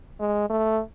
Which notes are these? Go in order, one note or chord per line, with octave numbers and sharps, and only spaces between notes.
G#3
A3